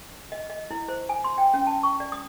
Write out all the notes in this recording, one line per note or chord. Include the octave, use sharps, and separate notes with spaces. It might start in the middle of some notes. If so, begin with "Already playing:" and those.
D#5
D#5
E4
C5
G#5
C6
G5
C#4
A5
C#6
D5
D#6